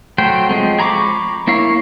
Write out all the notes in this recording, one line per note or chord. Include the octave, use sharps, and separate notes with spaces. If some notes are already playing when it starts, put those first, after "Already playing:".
F#3 A3 C5 G5
F3 G3 G#3 C4
G#4 A#5 B5 C#6 D6
A#3 E4 C#5 F5